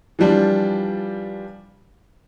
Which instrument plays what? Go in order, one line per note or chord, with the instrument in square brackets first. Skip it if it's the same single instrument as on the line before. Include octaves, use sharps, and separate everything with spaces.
[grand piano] E3 F3 G3 D4 F4